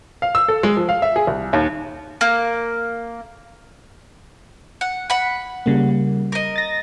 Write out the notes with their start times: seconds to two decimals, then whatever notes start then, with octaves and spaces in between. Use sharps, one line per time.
0.22 F5
0.35 E6
0.48 A4
0.63 G#3
0.76 F3
0.89 F5
1.02 E5
1.16 G#4
1.27 C2
1.53 D#2
2.21 A#3
4.81 F#5
5.10 F#5 B5
5.66 C#3 G3 A#3
6.32 A#4 D#5
6.56 A6 A#6